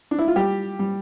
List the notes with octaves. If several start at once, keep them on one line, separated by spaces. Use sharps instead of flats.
D4
E4
F4
G3 G4
G3